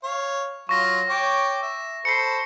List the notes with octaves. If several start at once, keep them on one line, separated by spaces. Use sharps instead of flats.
C#5 F5
F#3 F4 C#6 A#6
C#5 G5 D6
E5
A4 C5 B5 C7 C#7